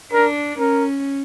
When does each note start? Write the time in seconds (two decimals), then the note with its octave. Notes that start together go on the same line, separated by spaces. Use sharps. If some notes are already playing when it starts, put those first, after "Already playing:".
0.13 D4 A#4
0.58 C#4 A#4